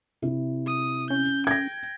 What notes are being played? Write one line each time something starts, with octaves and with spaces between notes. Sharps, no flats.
C3 E4
D#6
C#4 G6
G5 G#6 A#6